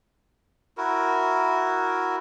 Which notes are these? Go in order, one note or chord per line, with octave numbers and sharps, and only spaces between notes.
E4 F#4 A#4